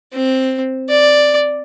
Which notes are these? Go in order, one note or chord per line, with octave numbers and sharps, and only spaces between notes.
C4
D5